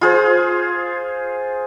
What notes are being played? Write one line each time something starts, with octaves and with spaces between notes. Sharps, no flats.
F4 G#4 C5